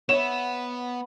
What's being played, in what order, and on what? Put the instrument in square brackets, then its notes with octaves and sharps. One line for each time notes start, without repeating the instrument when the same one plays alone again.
[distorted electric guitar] B3 [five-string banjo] C#5 E5 [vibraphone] F#5 B5 [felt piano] E7